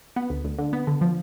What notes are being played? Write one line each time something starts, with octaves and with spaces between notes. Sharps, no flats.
B3
D2
D2
D3
B3
D3
F3